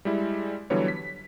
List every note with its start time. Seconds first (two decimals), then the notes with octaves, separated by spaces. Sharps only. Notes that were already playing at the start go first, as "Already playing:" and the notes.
0.05 G3 G#3 E4
0.70 D3 E3 F#3 G3 B3 C#5
0.88 B6